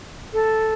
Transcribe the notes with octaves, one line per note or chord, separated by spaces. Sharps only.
A4